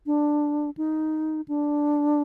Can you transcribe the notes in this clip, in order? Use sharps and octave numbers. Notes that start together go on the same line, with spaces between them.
D4
D#4
D4